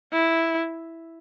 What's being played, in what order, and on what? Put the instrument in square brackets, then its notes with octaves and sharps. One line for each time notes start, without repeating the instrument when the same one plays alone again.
[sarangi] E4